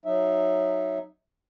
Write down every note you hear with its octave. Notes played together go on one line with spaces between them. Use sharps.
F#3 D#4 E5